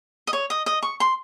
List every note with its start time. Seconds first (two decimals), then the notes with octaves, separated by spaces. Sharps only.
0.27 D#5
0.33 C#5
0.50 D#5
0.66 D#5
0.83 C#6
1.00 C6